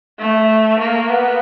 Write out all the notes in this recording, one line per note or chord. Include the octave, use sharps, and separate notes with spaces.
A3
A#3
B3